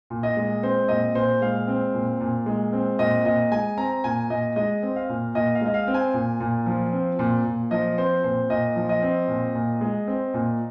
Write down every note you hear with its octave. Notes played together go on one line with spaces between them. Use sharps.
A#2
D#5
G#3
C4 C5
A#2 D#5
A#2 C5
G#3 F5
C4
A#2
A#2
G#3
C4
A#2 D#5
A#2 D#5
G#3 G#5
C4 A#5
A#2 G#5
A#2 D#5
G#3 D#5
C4
F5
A#2
A#2 D#5
F5
G#3 D#5
F5
C4
G#5
A#2
A#2
F3
C4
A#2
A#2
F3 D#5
C4 C5
A#2 C5
A#2 D#5
F3
D#5
C4
A#2
A#2
G#3
C4
A#2